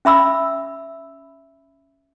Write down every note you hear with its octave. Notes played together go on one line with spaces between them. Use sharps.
C#4 E5 B5 E6